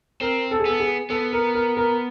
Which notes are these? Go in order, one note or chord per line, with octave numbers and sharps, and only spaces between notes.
C4 A#4
A4
G#4
B3 A4
G#4
B3 A4
A#4
A#4
A#4